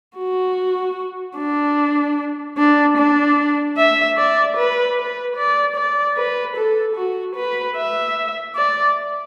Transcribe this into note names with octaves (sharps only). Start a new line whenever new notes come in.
F#4
D4
D4
D4
E5
D5
B4
B4
D5
D5
B4
A4
F#4
B4
E5
D5